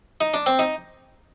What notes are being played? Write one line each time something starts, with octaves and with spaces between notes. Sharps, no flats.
D#4
D4
C4
D#4